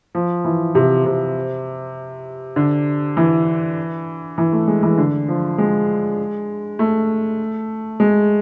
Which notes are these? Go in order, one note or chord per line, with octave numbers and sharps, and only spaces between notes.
F3
E3
C3
C3
D3
E3
E3
A3
G#3
E3
D3
F3
G#3
A3
G#3